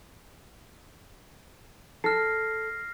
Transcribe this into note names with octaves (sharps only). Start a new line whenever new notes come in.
A4 F6 A#6 C7